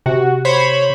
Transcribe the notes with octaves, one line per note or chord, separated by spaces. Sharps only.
C3 F#4
C5 C#5 B5